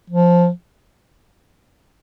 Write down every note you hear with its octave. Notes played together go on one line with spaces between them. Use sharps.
F3